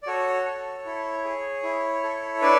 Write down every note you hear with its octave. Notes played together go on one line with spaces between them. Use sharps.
D5
F#4 A4 C#5
A4
E4
G#4
E4
A4
D4 B4 D5